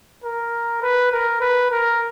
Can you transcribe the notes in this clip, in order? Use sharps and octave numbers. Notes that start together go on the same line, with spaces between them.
A#4
B4
A#4
B4
A#4